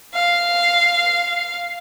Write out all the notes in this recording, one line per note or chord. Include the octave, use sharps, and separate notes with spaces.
F5